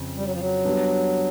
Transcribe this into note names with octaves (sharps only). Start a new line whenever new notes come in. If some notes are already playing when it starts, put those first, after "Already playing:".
Already playing: F2 C#3 C4
G3
F#3
F3
F#3
G3 B3 D4